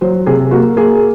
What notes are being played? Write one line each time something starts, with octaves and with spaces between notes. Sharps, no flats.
F#3 C5
C3 G#4
A#3 F#4
A#3 G#4